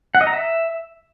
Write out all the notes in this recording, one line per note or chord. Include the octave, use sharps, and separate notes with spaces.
F#5
D#5
A#5
E5